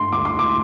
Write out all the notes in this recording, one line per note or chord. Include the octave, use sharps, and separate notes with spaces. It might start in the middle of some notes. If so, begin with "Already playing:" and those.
Already playing: D3 A3 C6
D2 D6
C6
D6